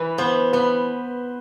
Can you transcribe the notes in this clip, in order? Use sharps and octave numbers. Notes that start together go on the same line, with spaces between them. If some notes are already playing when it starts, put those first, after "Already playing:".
Already playing: E3 B4
B3 C5
B3 B4